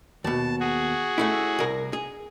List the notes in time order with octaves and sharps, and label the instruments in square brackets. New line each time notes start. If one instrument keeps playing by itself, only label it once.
[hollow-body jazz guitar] D#2 B2 [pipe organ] A5
[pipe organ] F#4 G#4
[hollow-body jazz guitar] A3 C#4 E4
C2 A#4
G#4